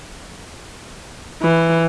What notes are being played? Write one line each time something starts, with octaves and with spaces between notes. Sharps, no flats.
E3